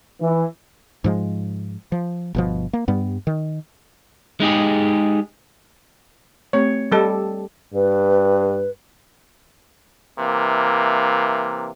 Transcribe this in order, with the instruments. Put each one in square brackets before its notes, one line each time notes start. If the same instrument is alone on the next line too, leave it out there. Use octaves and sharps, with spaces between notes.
[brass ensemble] E3
[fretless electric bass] G#2 F3 G#3
F3
G1 B2 F3
A#3
G2 G3 B3
D#3
[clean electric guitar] G#3 D#4 G4 G#4
[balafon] A3 C4 G4 [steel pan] C#5
[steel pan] G3 A4 [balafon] D#5 A5
[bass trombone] G2 [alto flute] B4
[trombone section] C3 E3 A#3